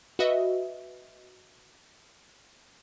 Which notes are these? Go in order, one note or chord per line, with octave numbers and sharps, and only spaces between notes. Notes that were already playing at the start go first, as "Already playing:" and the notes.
F#4 B4 D#5 E5